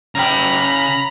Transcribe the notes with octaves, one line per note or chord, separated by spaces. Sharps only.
C#3 G5 A#5 B5